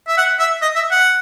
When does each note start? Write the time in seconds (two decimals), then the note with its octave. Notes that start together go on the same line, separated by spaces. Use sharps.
0.07 E5
0.17 F#5
0.39 E5
0.62 D#5
0.75 E5
0.91 F#5